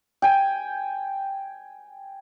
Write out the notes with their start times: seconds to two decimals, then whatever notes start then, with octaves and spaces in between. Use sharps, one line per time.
0.22 G5 G#5